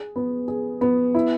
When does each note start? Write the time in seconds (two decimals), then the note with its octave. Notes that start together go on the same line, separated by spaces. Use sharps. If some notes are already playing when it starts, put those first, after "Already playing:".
Already playing: G#4
0.16 B3
0.48 G#4
0.81 B3
1.15 E4